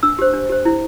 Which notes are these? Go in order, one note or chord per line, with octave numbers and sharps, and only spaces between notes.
D4 E6
G4 C5
D4
G4 C5
E4